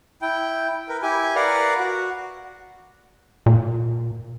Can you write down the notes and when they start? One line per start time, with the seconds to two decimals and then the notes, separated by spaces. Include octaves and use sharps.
0.22 E4 G5
0.89 A#4 B4
1.02 E4 G4 G#5
1.35 A#4 B4 D5 F5 F#5 A#5
1.78 F#4
3.46 A#2